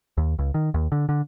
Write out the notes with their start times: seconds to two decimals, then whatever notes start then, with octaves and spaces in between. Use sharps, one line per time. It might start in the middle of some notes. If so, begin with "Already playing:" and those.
0.18 D#2
0.39 C#2
0.54 D#3
0.74 D#2
0.92 D3
1.09 D3